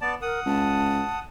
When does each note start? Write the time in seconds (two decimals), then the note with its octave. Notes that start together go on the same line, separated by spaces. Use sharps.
0.01 B3 D5 A5
0.22 A#4 F#5 D#6
0.46 C#2 A5